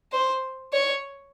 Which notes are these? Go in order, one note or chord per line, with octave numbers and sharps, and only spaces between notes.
C5
C#5